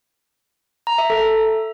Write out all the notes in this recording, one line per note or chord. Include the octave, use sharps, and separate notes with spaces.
A#5
E5
A4